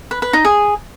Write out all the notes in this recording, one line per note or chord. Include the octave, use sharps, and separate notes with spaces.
B4
B4
D#4
G#4